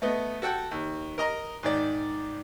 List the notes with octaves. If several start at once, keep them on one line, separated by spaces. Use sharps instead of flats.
A3 B3 D#5
F#4 A4 F#5 G5
D#2
A#4 D#5 A#5
G#2 D#3 D5